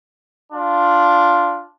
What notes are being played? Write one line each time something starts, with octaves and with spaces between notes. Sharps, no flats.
D4 F4